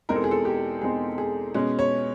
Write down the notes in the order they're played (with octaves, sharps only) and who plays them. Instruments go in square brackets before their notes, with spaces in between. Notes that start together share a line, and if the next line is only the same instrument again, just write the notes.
[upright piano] E2 B2 G#3 C4 D#4 A#4
A4
G#4
A4
G4
E2 B2 G#3 C4 D#4 G#4
G#4
B2 G#3 C#4
C#5